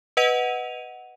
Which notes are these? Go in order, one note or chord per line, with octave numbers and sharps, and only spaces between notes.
B4 D#5 F#5 D#7 F7